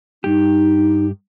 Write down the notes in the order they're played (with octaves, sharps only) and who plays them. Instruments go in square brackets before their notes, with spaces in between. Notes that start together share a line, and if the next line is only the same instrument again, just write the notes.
[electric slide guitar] G2 G4 [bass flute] D#4